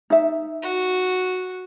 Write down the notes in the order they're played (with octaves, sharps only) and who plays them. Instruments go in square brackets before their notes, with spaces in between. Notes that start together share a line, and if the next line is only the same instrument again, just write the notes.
[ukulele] D#4 E5
[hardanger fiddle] F#4